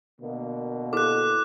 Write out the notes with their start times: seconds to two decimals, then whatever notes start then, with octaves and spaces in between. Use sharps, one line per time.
0.21 B2 D3 A#3
0.93 E4 A4 D6 F#6